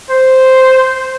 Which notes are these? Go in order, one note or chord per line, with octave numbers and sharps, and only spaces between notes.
C5